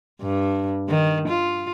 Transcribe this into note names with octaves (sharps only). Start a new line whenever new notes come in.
G2
D#3
F4